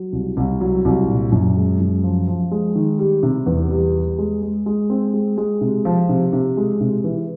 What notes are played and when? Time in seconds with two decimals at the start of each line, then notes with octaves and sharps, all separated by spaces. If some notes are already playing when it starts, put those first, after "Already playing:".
Already playing: F#3
0.13 C2
0.37 C2
0.61 F#3
0.85 C2
1.08 A#2
1.32 F#2
1.56 G#3
1.80 F#2
2.04 F3
2.28 F3
2.51 G#3
2.75 D#3
2.99 G3
3.23 C3
3.46 E2
3.71 G3
3.95 G3
4.18 G#3
4.42 G#3
4.66 G#3
4.90 C4
5.14 G#3
5.37 G#3
5.61 C3
5.85 F3
6.09 C3
6.33 C3
6.57 G#3
6.81 C3
7.04 E3